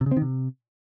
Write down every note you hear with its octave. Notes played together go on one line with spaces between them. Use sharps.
C3
C#3
C4
D#3
C3